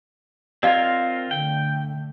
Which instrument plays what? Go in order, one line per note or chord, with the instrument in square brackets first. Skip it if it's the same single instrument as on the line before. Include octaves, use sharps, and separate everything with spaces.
[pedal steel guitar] C4 F4 A#4 [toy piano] D5 D#5 F5
[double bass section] D3 A3 [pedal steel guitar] G5